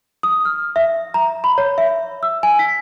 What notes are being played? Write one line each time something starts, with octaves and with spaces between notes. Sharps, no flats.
D#6
F6
E5
A#5
B5
C#5
E5
E6
G#5
B6